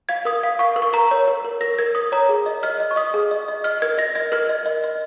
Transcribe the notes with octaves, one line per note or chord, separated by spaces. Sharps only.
F5 G#6
A#4 D#6
F5
F5 C#6
A#4
C#6
A#4 A#5
C#5
A#4
A#4
A#4 A#6
A#4 G#6
A#4 D#6
C#5 A#5
G#4
D#5
D#5 F6
D#5
C#6
D#5 D#6
G#4
D#5
D#5
D#5 F6
A#4 G#6
D#5 A#6
D#5 G#6
A#4 F6
D#5
D#5
D#5